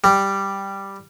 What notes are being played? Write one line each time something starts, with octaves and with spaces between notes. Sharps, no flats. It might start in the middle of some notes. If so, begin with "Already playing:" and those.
G3